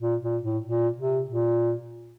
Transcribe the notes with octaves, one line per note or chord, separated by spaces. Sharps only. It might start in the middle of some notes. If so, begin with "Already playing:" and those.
A#2
A#2
A2
A#2
C3
A#2